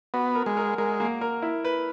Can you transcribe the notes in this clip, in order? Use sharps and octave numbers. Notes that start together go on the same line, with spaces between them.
B3 F#4
A#4
G#3
A#4
G#3 A#4
A#3
A#4
E4
B4